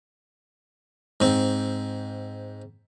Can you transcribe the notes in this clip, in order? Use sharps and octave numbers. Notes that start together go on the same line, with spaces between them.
G#2 C4